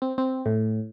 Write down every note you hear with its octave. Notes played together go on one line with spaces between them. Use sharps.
C4
C4
A2